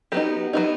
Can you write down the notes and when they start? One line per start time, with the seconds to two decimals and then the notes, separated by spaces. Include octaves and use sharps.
0.12 F#3 B3 D#4 G4
0.53 F#3 B3 D#4